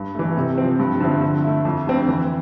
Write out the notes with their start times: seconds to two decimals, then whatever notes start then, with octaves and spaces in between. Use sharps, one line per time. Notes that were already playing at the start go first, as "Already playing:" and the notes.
Already playing: G2
0.15 E3 A3
0.37 C3
0.58 F3 C4
0.79 G2
1.00 D3 F3 C4 E4
1.21 D3
1.44 A3 E4
1.65 F2
1.87 D3 A3 C4
2.08 E3